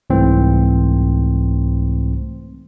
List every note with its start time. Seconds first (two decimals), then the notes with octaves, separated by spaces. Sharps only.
0.10 C2 G#2 E3 A3 C4 C5